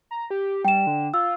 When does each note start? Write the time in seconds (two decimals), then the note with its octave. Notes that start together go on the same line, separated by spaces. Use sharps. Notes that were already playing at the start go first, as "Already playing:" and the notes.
0.11 A#5
0.30 G4
0.65 G3 G5 E7
0.87 D3
1.14 F4 E6